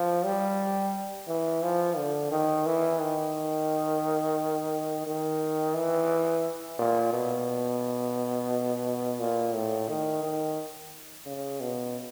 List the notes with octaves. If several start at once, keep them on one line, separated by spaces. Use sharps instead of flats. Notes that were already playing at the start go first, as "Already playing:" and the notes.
Already playing: F3
G3
E3
F3
D3
D#3
E3
D#3
D#3
E3
A#2
B2
A#2
A2
D#3
D#3
C#3
B2